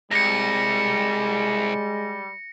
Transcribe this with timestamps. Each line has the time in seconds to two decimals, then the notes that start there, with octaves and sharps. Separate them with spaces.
0.11 C2 G3 G#3 A#6 C#7